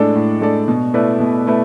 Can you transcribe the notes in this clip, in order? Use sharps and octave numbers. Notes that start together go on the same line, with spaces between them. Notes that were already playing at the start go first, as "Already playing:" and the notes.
Already playing: A2 G#3 D4 A4 D5
A2
G#3 D4 A4 D5
B2
A3 E4 B4 D5
B2
A3 E4 B4